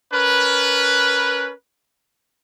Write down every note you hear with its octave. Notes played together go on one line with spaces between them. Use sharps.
C#4 A#4 B4